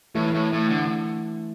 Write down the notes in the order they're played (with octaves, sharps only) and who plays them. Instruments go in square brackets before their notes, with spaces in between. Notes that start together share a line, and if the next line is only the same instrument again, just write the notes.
[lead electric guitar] A2 [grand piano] E3 A3
[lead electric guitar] A2
A2
D3